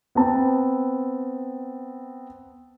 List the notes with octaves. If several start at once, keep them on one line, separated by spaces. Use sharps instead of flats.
B3 C4 A5